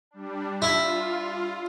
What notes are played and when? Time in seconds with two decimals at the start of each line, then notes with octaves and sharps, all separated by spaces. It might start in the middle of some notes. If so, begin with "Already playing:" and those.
0.11 G3 D4
0.62 E4 F4